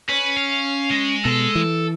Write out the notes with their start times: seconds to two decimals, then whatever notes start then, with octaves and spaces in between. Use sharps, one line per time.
0.09 C#4 B4
0.37 F5
0.91 G#3
1.25 B2 A4
1.55 E3